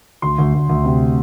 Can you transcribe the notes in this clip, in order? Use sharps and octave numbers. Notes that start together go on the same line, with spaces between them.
D2 C6
D2
D2
D2
C3